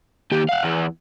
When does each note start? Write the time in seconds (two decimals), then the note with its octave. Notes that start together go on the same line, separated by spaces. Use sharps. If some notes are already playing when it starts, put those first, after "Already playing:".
0.31 D#2 G4
0.49 F5 F#5
0.63 E2 E3